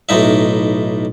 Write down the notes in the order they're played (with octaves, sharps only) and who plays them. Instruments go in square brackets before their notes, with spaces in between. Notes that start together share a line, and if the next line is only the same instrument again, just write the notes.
[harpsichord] B1 A2 D#4 E5